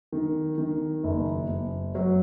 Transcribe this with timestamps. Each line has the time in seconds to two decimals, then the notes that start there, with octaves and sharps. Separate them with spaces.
0.12 D#3
0.58 D#3
1.04 F#1
1.49 F#1
1.95 F#3